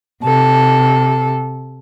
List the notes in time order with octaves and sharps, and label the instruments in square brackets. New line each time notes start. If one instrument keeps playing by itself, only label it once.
[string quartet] C3 A4